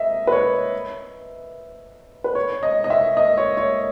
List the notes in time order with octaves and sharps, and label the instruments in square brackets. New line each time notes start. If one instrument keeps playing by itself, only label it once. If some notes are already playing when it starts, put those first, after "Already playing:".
Already playing: [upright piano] D#5 E5
B4
C#5
B4
C#5
D#5
D#5
E5
D#5
C#5
C#5